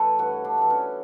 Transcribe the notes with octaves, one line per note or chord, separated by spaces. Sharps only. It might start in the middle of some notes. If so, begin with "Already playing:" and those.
Already playing: E3 A3 A4 B4 C#5
G2 F#4
D4
E3 A3
C#4